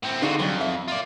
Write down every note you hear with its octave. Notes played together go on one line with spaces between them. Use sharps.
A2 C4
D3 D#4 F4 F#4 G#4
F2 F#3
E5
F4 D5